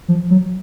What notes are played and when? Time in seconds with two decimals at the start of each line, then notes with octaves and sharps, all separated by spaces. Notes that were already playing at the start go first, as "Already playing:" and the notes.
0.08 F3
0.30 F#3